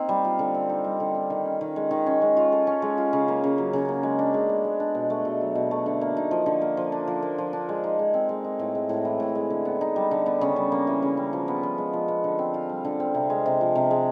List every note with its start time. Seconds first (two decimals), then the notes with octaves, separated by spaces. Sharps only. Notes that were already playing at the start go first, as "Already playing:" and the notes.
Already playing: A#3 C4 D#4
0.09 G3
0.25 F4
0.39 D3
0.54 C4
0.69 D#4
0.84 G3
1.00 D3
1.15 C4
1.30 D#3
1.45 C#4
1.61 D#3
1.76 G#3
1.91 D#3
2.06 C#4
2.22 G#3
2.37 F4
2.52 A4
2.67 C#4
2.82 G#3
2.98 F4
3.13 C#3
3.28 A#3
3.44 C#3
3.58 F#3
3.73 C#3
3.89 A#3
4.03 G#3
4.19 D4
4.34 G#3
4.49 B3
4.64 G#3
4.80 D4
4.95 B2
5.10 A3
5.25 B2
5.41 F#3
5.55 B2
5.71 A3
5.86 D3
6.01 A#3
6.17 D#4
6.31 F3
6.46 D3
6.61 A#3
6.77 F3
6.92 D4
7.08 F3
7.22 A#3
7.38 F3
7.53 D4
7.69 G#3
7.84 D#4
7.99 G#3
8.14 C4
8.29 G#3
8.44 D#4
8.59 A2
8.75 G#3
8.89 A2
9.05 E3
9.20 A2
9.35 G#3
9.50 D3
9.65 B3
9.81 D#4
9.96 G3
10.11 D3
10.26 B3
10.41 C#3
10.56 G3
10.72 A#3
10.87 E3
11.02 C#3
11.17 G3
11.33 F3
11.48 B3
11.63 F3
11.78 G#3
11.93 F3
12.08 B3
12.24 D3
12.39 C4
12.54 F4
12.69 G3
12.85 D3
13.00 C4
13.15 C3
13.30 G#3
13.46 C3
13.61 F3
13.75 C3
13.91 G#3